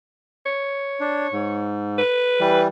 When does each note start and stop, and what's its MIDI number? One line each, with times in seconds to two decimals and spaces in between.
0.46 1.69 73
1.00 1.27 62
1.33 2.01 44
1.98 2.61 71
2.40 2.68 52
2.40 2.68 55